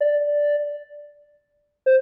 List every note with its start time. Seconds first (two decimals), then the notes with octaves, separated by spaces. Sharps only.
0.01 D5
1.86 C5